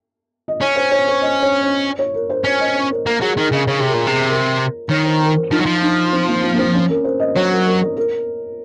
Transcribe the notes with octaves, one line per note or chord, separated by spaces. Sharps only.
D#5
C#4 C#5
C5
C#5
C5
D#5
C#5
C#5
C#5
A#4
C5
C#4 C#5
D#5
C#5
A#4
A#3 A#4
F#3 G#4
D#3 A#4
C#3 D#5
C#3 C#5
C3 G#4
A#4
A#2
C3 G#4
A#4
D#3 C#5
C5
A#4
A#4
F3 D#4
F#3
F3
D#4
C4
A#3
C4
A#3
C4
C#4
A#4
C5
D#5
F#3 C#5
A#4
A#4
A#4
A#4